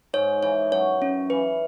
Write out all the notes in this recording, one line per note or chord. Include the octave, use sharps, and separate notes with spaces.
G#2 G#3 C#5
E3 C#5
F#2 F#3 C#5
C#4
E3 B4